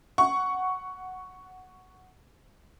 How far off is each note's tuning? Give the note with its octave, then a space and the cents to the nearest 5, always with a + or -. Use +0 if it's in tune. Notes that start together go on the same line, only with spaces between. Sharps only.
F#5 +0 C#6 +5